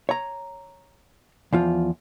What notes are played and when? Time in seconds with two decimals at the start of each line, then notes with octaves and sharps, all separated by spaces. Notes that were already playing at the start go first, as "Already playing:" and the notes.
0.09 C#5 A#5
1.53 E2 F3 F4